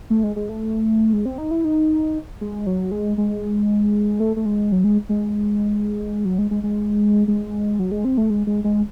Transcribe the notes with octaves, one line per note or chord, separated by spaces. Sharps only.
A3
G#3
G#3
A3
G#3
C4
D#4
E4
D#4
G#3
F#3
G#3
G#3
A3
A3
G#3
F#3
G#3
G#3
F#3
G#3
G#3
G#3
G#3
F#3
G#3
C4
A3
G#3
G#3
G#3